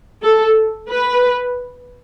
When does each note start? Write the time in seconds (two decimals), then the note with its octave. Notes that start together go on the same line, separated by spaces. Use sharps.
0.23 A4
0.89 B4